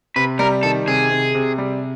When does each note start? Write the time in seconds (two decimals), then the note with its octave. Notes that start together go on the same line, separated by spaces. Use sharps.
0.16 C3 B4
0.39 G3 A#4
0.63 D#3 A4
0.88 C3 G#4
1.11 C3
1.35 C3
1.58 G3